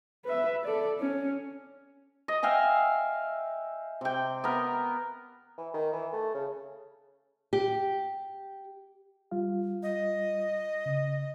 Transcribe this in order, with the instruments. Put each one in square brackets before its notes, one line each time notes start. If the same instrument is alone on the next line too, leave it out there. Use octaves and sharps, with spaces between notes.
[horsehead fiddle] B4 E5
A4 D5
C#4
[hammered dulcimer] D#5
E5 F5 G5 G#5
C3 G5
B3 A#4
[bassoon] E3
D#3
E3
A3
C#3
[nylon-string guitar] G4
[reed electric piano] G3 F4 F5
[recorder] D#5
[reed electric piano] C#3